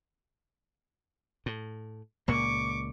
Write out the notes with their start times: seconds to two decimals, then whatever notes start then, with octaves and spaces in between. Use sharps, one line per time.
1.46 A2
2.28 C#2 A#2 A#3 C#6 D6